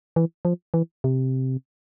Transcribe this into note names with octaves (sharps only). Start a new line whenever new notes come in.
E3
F3
E3
C3